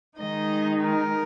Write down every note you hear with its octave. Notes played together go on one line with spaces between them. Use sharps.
D#3 G#3 D#4 D#5
A#4